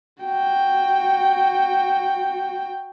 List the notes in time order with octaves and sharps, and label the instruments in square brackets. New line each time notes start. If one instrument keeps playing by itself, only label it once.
[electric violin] F#4 G5